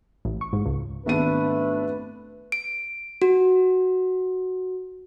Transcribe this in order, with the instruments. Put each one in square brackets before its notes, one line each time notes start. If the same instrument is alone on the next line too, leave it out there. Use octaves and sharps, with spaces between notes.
[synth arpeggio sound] A1
C#6
G#2
C#2
[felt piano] G#1 B3 D#7 [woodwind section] A3 D4 [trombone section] B4
[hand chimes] D7
F#4